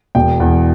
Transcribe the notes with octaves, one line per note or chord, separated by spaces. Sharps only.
E1 G5
E2